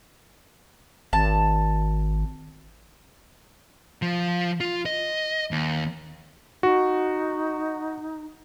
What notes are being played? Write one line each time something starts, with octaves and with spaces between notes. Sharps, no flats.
G#1 A5
F3
F4
D#5
D#2
D#4 F#4